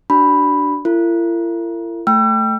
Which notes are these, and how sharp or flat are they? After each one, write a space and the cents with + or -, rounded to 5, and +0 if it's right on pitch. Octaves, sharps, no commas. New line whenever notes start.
D4 +0 F#4 +35 B5 +0
E4 +45 A#4 -45
A3 +0 G5 +0 E6 +40